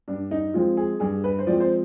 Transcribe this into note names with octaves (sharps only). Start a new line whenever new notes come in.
G2 D4
D#4
F3 G#3 C4 F4
G#4
G2 G#4
B4
C5
F3 G#3 C4 D5
C5